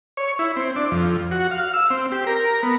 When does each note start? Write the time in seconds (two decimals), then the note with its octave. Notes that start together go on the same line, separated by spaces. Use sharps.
0.17 C#5
0.39 E4
0.56 C4
0.76 D4
0.91 F2
1.31 F#4
1.51 F5
1.74 E6
1.91 C4
2.12 G4
2.27 A#4
2.63 B3